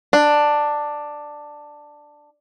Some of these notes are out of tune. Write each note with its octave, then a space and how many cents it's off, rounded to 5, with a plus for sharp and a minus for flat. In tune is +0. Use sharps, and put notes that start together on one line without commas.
D4 +10